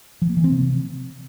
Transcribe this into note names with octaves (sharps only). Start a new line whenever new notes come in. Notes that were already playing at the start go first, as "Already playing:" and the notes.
F3
A#3
E3
C4
C3